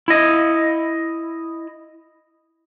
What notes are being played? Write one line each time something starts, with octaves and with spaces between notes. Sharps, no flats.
E4 D#5